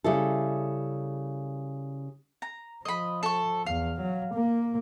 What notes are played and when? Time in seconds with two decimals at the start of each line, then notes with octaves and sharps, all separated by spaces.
0.04 C#3 G3 E4 A4
2.42 A#5
2.85 F3 D#5 B5
3.23 A4 C#6
3.66 E2 F5
4.00 F#3
4.35 A#3